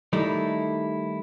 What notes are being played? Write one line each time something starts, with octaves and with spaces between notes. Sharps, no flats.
D#3 G3 A3 D#4 E4